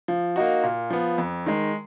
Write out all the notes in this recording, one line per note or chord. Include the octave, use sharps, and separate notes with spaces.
F3
A#3 D#4 F#4
A#2
F3 B3
F2
D#3 G#3